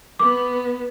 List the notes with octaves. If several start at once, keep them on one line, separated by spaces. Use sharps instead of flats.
B3 D6